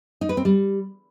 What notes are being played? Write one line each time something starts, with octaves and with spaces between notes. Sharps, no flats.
D#4
B4
C4
G3